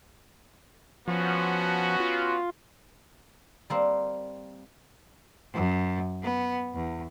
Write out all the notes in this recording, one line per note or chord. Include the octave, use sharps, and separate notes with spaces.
F3 B3 C#4 F#4
F4
G3 A#3 C4
F#2
B3
E2